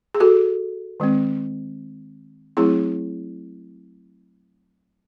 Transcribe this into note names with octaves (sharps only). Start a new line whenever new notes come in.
G#4
F#4 A4
D#3 G#3 C4
F#3 A3 C4 E4 G#4